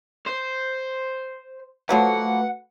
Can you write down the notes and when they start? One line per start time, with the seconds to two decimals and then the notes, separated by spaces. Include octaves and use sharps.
0.26 C5
1.89 F3 F#3 A3 A#3 F#4 B4 F#5